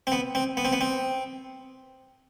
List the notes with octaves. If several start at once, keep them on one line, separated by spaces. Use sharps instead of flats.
C4
B3
C4
B3
C4
B3
C4